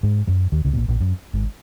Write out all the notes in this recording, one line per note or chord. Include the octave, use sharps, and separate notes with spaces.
G#2 G#3
F#2 F#3
D#2 D#3
C#2 C#3
B2
A#1 A#2
A#1 A#2
F#2
G#1 G#2